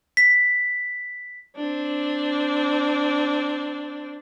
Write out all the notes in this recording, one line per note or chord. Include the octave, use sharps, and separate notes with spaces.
B6
C4 D4